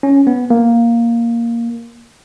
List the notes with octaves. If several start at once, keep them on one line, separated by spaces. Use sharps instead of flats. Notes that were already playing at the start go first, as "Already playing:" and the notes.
C#4
B3
A#3